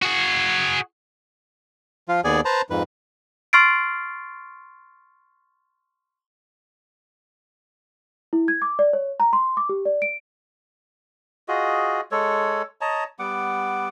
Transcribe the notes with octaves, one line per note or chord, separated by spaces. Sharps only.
F#4 G#4
F3 F4
D#2 B3 G#4 D5 G#5
B4 C5 A5 A#5
F2 G#2 B4
C6 C#6 F6 A6 C7 D7
E4
G#6
D6
D5
C#5
A#5
C6
D6
G4
D5
D7
F4 F#4 G#4 D#5
G#3 A4 C#5
C#5 D#5 A5 A#5
G3 B3 F#5 D6